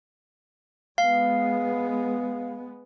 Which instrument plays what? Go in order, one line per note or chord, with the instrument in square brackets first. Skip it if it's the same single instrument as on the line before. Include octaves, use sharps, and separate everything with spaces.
[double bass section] G#3 B3 [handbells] F5